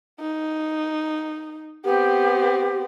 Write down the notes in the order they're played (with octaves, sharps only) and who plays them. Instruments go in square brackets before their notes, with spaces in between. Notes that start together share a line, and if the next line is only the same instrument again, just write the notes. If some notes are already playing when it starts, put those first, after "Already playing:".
[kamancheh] D#4
[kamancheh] B3 C4 [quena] G4